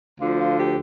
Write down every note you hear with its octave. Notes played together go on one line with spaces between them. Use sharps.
D2 D3 F3 F4
F4
G4